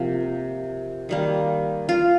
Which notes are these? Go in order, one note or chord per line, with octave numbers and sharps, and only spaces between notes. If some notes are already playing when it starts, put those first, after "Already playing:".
Already playing: C3 F3 A#3
D#3 G3 A#3
F4